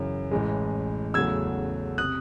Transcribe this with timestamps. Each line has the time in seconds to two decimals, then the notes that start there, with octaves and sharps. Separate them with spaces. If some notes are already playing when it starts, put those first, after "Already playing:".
Already playing: F#2 C#3 E3
0.31 A1 A2 E3 G#3
1.14 E2 C#3 F#3 A3 E6 G#6
1.98 C3 D#6 F#6